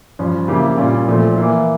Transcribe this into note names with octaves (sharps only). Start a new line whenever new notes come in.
G2 F3 C#4
C#3 F3 A#3 E4 G4
A#2 G3 C#4 F4
A#2 F3 A3
E3 A#3 E4